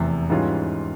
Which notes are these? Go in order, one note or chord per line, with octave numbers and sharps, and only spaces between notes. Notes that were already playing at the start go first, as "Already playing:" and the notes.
Already playing: F1 E2 C3
G#2 E3 G3 C#4 F4